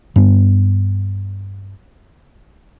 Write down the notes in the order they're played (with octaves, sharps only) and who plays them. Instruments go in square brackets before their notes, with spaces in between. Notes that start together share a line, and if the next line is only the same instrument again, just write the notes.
[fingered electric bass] G2 B3